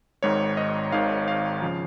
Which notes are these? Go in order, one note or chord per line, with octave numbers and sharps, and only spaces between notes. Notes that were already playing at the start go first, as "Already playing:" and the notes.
G#1 G#2 D#3 C#5
D#5
G#1 G#2 D#3 F5
F5
C#3 F3